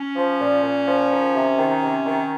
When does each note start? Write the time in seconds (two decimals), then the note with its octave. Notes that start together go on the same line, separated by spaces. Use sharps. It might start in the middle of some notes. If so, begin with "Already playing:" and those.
Already playing: C#4
0.16 F3
0.40 A#2
0.63 A#2
0.87 F3
1.11 D#3
1.35 C3
1.58 D#3
1.83 C3
2.06 D#3